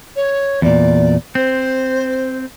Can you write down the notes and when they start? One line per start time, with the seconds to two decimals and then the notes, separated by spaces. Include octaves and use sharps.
0.15 C#5
0.62 E2 A#2 D5
1.35 C4 C5